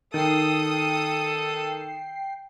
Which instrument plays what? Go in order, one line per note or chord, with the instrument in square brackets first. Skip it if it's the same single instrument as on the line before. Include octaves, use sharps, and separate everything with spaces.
[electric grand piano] D#3 [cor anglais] A4 [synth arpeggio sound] G5 C7 [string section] D#6